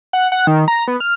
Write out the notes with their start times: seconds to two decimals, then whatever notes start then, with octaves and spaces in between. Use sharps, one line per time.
0.13 F#5
0.32 F#5
0.47 D#3
0.68 A#5
0.88 B3
1.00 F6